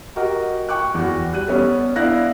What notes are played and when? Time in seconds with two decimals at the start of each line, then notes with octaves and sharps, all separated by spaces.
0.16 F#4 G4 A#4 D#5
0.69 G5 C#6 D6 F#6
0.94 E2 F#4
1.32 G3 F#6 D#7
1.48 G3 B3 C#4 A4
1.96 B3 D4 E4 F5 F#6 A#6